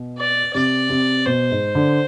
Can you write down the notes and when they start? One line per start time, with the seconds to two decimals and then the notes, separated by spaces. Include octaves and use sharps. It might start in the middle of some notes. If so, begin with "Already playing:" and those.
Already playing: B2
0.18 D5
0.53 C3 D5
0.90 C3
1.26 B2 C5
1.51 G#2
1.75 D3